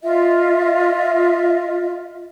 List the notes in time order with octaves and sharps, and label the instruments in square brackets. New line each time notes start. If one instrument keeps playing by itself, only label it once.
[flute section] F4 D#5 E5